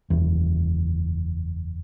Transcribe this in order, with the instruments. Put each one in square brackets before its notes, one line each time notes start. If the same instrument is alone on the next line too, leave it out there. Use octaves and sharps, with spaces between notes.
[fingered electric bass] F#1 E2